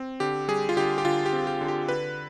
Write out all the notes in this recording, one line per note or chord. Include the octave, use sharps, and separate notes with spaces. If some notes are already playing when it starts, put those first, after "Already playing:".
Already playing: C4
D3 G4
G3 G#4
F4
D3 G4
G4
D3 F4
G4
C4
G4
D3
G4
D3 B4